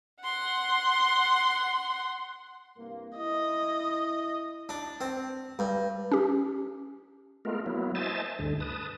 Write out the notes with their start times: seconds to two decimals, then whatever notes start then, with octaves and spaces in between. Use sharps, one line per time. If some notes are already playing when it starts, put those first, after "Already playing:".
0.22 F#5 C6
2.77 C2 G2 A#3
3.17 E4 D#5
4.69 D4
5.01 C4
5.59 G2
6.11 C#4 G4
7.45 G#3 A3 B3 F4 A#4
7.66 F#3 A#3 B3 E4
7.95 C5 D#5 E5 G#5 A5 A6
8.39 D2 G2 D3
8.60 B4 A5 D#6